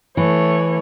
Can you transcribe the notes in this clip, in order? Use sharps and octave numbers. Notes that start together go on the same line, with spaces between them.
E3 A3 C#5